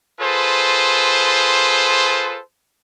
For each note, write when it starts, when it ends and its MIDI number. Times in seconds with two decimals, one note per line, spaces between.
0.20 2.40 65
0.20 2.40 68
0.20 2.40 69
0.20 2.40 71
0.20 2.40 72